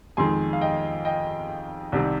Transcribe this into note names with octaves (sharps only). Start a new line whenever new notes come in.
F2 D#3 G#3 G#5 C6
F5
D#5 G5
D#5 G5
C2 C3 D#3 G3